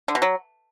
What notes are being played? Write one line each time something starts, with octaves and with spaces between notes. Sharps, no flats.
D3
B2
F#3